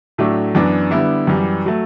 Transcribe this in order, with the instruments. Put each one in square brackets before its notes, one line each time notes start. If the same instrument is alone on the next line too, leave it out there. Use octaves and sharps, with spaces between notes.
[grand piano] A2 F#3 A3 D4
F#2 E3 B3 D4
D3 G3 B3 E4
F#2 E3 G3
F#3 A3